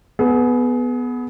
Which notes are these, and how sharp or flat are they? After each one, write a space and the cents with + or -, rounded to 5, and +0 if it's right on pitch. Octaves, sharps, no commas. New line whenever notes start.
B3 +0 G#4 +30